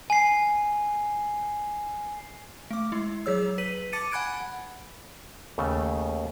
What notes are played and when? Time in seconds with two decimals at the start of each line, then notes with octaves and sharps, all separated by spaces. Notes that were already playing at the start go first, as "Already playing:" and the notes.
0.10 G#5 C7
2.71 A3 D6
2.92 G#3 E4
3.26 F#3 G#4 C#5 E6
3.58 B4 B6 D#7 F#7
3.92 A5 D6 A6 C#7 D#7
4.11 F#5 G#5 B5 F#6 G#6 D7
5.58 D#2 C#3 A3